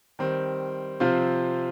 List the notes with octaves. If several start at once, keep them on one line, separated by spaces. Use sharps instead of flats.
D#3 G3 C4
C3 F3 C4 F4 C5